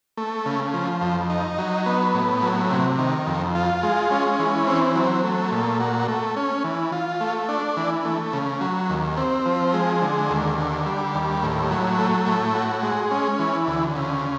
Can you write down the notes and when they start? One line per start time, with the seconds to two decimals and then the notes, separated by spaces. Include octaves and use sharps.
0.17 A3
0.46 C#3
0.74 F3
1.02 F2
1.30 D#4
1.58 F#3
1.86 B3
2.14 A2
2.42 F#3
2.70 C3
2.99 D#3
3.27 F2
3.55 F4
3.83 G#3
4.11 C#4
4.39 E3
4.67 C4
4.95 F#3
5.24 A3
5.52 A#2
5.80 F#4
6.08 A3
6.36 C#4
6.64 E3
6.92 F4
7.20 A3
7.49 D4
7.77 E3
8.05 A3
8.33 C#3
8.61 F#3
8.89 D#2
9.17 C4
9.46 F3
9.73 G#3
10.02 D3
10.30 D#2
10.58 D3
10.86 G3
11.14 D#2
11.43 A2
11.71 F#3
11.98 A3
12.26 A2
12.55 F#4
12.83 G#3
13.11 C#4
13.39 E3
13.67 D2
13.95 C#3